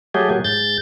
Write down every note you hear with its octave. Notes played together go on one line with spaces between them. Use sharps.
F#3 A3 G4 G#4
A#2 F#3
G#2 G6 A6